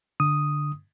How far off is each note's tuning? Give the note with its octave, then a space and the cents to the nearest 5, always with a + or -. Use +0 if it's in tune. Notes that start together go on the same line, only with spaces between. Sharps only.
D3 +0 D#6 +0